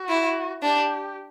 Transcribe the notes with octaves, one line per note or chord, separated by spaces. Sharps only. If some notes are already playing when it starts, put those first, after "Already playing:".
Already playing: F#4
E4
D4 G4